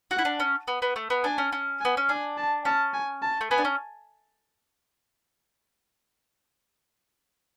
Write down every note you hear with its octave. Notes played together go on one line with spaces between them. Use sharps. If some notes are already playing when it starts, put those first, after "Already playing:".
F#4 F#5
E4
D4
C#4
B3
B3
A3
B3
D4 G#5
C#4
C#4
G#5
B3
C#4
D4 G#5
A5
C#4 A5
G#5
A5
A3
B3 G#5
D4
C#4